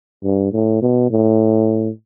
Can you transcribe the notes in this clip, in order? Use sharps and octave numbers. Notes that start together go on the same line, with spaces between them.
G2
A2
B2
A2